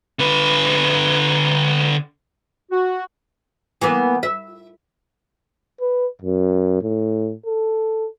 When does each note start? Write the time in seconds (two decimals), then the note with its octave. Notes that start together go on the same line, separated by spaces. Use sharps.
0.19 D3 B4
2.72 F#4
3.81 E3 A#3 B3
4.23 E5
5.81 B4
6.22 F#2
6.82 A2
7.46 A4